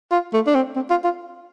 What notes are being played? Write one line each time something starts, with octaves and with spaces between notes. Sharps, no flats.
F4
A3
D4
C4
C4
F4
F4